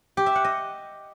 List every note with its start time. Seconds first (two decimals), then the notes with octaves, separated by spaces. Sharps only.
0.17 G4
0.26 E5
0.35 F#5
0.44 D#5